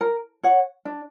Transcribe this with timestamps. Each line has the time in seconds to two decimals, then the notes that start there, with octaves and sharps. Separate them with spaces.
0.01 A#4
0.43 C#5 F#5
0.85 D4